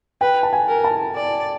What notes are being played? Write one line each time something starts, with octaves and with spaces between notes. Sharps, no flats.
B4 G5
A5
G#5
A#4
A5
D5